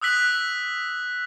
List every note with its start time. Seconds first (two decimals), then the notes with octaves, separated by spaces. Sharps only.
0.01 D#6 E6 F#6 B6 F#7